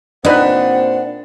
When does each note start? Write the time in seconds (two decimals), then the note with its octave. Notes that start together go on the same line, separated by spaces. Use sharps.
0.25 A#2 C4 D4 D#4 B4 C5 D#5 F#5